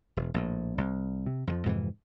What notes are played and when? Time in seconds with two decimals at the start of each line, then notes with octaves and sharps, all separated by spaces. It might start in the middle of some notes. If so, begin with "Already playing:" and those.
0.17 E1
0.34 A#1 A2
0.78 C2
1.26 C3
1.47 F2 D#3 F3
1.66 F2 G#2 C3 E3